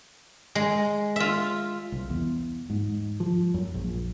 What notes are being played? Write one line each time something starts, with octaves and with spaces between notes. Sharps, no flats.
G#3
F4 E5
C2
E2
G#2
F3
F#2
A#1